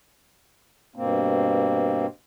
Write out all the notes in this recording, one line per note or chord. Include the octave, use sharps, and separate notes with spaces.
G2 B2 A#3 C4